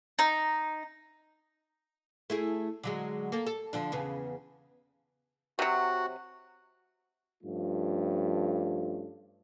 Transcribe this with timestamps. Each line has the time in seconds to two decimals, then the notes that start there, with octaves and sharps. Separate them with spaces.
0.19 D#4
2.30 A3 E4 G#4
2.83 D3 F#3 G#3
3.32 A#3 A4
3.47 A4
3.73 D3 F3 D4
3.92 E2 C#3 B3
5.59 C3 F#3 F#4
7.44 G2 F3 A3 C#4 F4